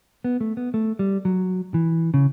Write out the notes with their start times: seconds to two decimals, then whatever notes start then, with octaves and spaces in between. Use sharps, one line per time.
0.24 B3
0.41 A3
0.57 B3
0.74 A3
0.99 G3
1.25 F#3
1.74 E3
2.14 C#3